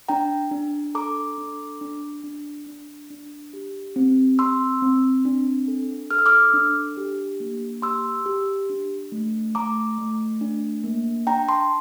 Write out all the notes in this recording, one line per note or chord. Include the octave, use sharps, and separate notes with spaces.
D4 G5 A#5
D4
A4 A#5 D6
D4
D4
D4
D4
D4
G4
C4
C4 C6 E6
C4
D4
A4
A4 F6
E6
D6 F6
D4
G4
A#3
G4 C6 E6
G4
D4
A3
A3 A#5 D6
A3
D4
A#3
D4 G5 A#5
A5 C6